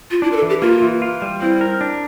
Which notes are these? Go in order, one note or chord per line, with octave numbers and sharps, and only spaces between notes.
F4
D4 E4
A#4
A4
E3
G4
A#3 F4
E3
F4
G3
C4 E4
A#4
D4